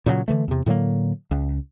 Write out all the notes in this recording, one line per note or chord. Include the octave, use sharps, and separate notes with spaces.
A#2 C#3 E3 F#3
D3 E3 A3
E2 C3
A2 D3 F#3 A#3
C#2